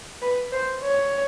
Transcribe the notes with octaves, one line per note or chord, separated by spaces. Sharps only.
B4
C5
C#5